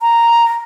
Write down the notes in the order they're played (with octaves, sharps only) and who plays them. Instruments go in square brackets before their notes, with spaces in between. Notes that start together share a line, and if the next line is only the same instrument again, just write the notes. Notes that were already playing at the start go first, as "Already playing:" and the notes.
[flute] A#5